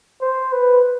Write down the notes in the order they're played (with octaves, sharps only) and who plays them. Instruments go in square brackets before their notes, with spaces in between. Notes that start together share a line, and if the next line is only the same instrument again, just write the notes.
[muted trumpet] C5
B4